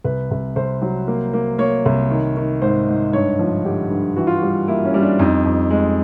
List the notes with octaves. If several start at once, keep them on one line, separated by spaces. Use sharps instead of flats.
C2 B4
C2
C2 C5
F#3
A#3
A#3
A#3 C#5
C2
D#3
D#3
G#2 C5
G#2
G2 C#5
F3
D3 G4
G2
E3 F#4
F4
G3 F#4
A#3 E4
C#4
G3
D4
F2 D#4
F2
G#3